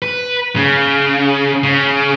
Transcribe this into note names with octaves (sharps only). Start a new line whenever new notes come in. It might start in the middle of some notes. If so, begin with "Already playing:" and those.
B4
C#3
C#3